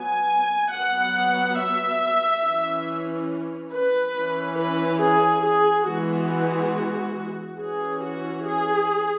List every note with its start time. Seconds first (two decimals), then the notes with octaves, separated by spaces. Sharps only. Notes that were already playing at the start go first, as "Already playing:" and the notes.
Already playing: F#3 B3 G#5
0.72 F#3 B3 F#5
1.58 E5
2.44 E3 C#4
3.73 B4
4.15 E3 C#4
4.58 B4
5.01 G#4
5.44 G#4
5.87 E3 G#3 B3 F#4
7.59 E3 C#4 G#4
8.01 F#4
8.45 G#4